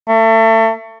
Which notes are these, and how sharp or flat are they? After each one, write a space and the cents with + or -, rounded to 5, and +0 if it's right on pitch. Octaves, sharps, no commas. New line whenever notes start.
A3 +30